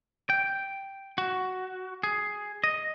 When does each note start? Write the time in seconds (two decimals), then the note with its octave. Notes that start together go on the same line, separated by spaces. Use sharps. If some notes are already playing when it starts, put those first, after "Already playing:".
0.30 G5
1.18 F#4
2.03 G#4
2.64 D#5